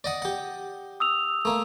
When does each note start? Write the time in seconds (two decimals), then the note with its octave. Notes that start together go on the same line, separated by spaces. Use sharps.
0.04 D5 D#5 F#5
0.22 G4 F#5
1.00 D#6 E6 F7
1.45 A3 A#3